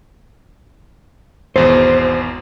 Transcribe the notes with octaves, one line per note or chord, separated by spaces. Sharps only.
G#1 E2 B2 C5